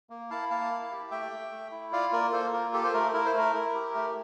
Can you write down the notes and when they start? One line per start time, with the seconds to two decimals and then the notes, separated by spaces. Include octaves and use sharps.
0.10 A#3
0.30 E4 F5 A5
0.50 A#3 F5 A5
0.71 E4
0.91 G4
1.11 A3 E5 G5
1.32 A3
1.51 A3
1.72 E4
1.92 F4 D5 F5
2.12 A#3 A#4 D5
2.33 A#3 A4 C5
2.53 F4 A#4
2.73 G4 A4
2.84 C5
2.94 A3 A#4
3.14 E4 A#4
3.26 C5
3.33 A3 A#4
3.54 E4
3.75 G4
3.94 A3